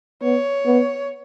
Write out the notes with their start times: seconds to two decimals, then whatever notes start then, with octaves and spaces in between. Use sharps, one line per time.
0.22 B3 C#5
0.66 B3